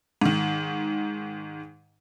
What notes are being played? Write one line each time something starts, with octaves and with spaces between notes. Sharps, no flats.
G#2 D#3